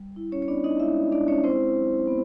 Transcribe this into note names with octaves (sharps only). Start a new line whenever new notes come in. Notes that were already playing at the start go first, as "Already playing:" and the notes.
Already playing: G3
E4
C#4 C#5
C#5
B3 D4 D5
D#4 D#5
G#3 E4 E5
G#3 D4 D5
C#4 C#5
C4 E4 C5
F#3
B3